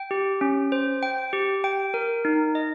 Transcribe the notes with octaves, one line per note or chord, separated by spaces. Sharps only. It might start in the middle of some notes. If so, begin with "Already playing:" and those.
Already playing: G5
G4
C#4
C5
G5
G4
G5
A#4
D#4
D#5